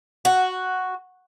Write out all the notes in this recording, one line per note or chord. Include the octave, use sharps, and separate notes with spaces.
F#4